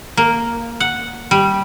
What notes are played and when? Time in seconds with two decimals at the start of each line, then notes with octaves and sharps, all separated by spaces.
0.17 A#3
0.80 F#5
1.31 G3